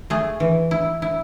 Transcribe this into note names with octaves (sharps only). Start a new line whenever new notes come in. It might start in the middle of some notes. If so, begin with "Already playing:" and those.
A3 G#4
E3
E4
E4